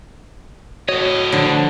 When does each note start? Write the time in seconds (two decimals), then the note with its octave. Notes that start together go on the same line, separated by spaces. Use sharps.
0.89 A2 F#4 C#5 D#5
1.32 D3 F3